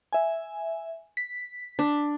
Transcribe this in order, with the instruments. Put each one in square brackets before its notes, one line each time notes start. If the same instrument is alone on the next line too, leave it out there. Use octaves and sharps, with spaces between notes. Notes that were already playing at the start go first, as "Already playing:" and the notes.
[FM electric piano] E5 G#5
B6
[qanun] D4